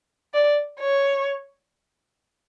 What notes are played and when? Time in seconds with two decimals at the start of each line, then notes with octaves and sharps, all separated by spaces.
0.34 D5
0.80 C#5